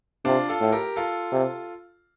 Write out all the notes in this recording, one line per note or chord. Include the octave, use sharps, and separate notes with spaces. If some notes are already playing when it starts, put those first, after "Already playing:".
C3 D4 F4
F4 A4
A2
G4 A#4
F4 A4
C3